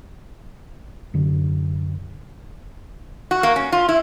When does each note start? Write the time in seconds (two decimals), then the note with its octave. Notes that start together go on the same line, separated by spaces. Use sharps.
1.14 F#2 D3
3.31 F#4
3.43 A#3
3.56 C#4
3.72 F4
3.89 E4